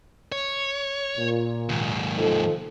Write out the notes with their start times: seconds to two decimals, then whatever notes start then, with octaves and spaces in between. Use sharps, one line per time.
0.32 C#5
1.18 A#2
1.69 D#2 G#2
2.17 F3 D#4 A4